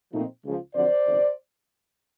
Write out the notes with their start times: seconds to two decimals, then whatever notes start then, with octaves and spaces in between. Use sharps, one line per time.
0.13 A#2 F3 A3 C4 D#4
0.45 C#2 C#3 F3
0.75 F2 D3 F#3 C5 D5
1.06 G1 F2 C3